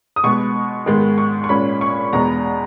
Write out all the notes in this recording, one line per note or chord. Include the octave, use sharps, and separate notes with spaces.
D#6
B2 G#3 B3 C#6
G#2 D#3 G#3 B3
C#6
C#6
A#2 G#3 C#4 B5
C#6
E2 B2 G#3 B3 A#5